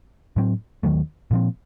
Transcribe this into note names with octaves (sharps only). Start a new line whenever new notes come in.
A2 F#3 C4
D#2 D#3 F#3 A3
A#2 F3 C4